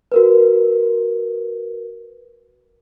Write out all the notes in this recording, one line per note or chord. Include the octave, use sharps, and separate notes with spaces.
F#4 A#4 B4